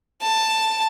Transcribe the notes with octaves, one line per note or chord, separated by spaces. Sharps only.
A5